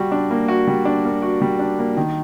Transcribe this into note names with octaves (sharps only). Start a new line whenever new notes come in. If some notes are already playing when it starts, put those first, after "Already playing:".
Already playing: G3 F#4
D4
A#3
F#4
G3
D4
A#3
F#4
G3
D4
A#3
D#3